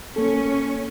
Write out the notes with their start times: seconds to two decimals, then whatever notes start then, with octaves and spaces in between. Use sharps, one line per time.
0.16 A#3 C#4 A4